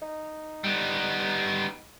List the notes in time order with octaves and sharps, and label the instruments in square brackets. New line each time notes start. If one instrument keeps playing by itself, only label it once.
[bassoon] D#4
[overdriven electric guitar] G3 B3